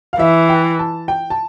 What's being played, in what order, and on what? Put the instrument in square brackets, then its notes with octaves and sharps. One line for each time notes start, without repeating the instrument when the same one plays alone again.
[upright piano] F5
[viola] E3 [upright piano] E5
[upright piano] G5
A5
G5
A5